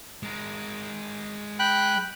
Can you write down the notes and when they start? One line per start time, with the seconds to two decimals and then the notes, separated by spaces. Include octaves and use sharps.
0.23 G#3 A#4
1.59 G5 B5 F#6